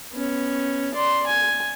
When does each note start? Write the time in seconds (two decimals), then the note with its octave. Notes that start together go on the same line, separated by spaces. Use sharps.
0.13 B3 C#4
0.94 D5 C6
1.27 G#5